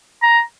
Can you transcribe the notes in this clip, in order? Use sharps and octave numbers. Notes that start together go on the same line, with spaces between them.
A#5